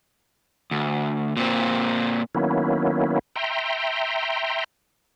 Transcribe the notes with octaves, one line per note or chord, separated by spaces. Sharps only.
D2
A#2 C4
D#3 F#3 A#3 B3 C#4 E4
E5 G5 A#5 C6